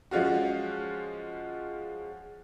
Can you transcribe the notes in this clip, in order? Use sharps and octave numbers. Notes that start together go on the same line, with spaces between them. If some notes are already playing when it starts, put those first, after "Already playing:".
F3 G#3 C#4 F4 F#4